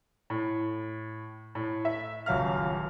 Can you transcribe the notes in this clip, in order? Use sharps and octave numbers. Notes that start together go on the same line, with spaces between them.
A2
A2
E5
D#1 C#2 F#3 F5 F6